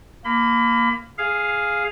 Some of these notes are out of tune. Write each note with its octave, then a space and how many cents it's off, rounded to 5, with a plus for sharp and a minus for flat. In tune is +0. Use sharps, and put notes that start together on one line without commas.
A#3 +0 B5 +30
G#4 +0 F5 +0